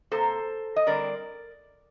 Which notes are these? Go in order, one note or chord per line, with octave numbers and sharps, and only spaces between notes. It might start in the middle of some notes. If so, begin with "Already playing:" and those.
C3 F3 A#3 A4 C5
D#5
D3 G3 C4 A#4 D5